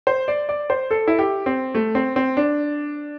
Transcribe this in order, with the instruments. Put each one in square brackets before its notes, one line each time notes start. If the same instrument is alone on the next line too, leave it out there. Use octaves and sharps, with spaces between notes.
[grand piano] C5
D5
D5
C5
A4
E4
G4
C4
A3
C4
C4
D4